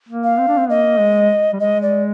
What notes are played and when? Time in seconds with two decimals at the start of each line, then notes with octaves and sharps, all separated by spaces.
0.09 A#3
0.24 F5
0.39 C4
0.48 D4
0.57 C4
0.69 A#3 D#5
0.99 G#3
1.53 G3
1.60 G#3 D#5
1.82 D5